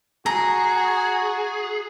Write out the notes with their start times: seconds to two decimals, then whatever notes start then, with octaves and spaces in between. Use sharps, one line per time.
0.26 F#4 G#4 A#5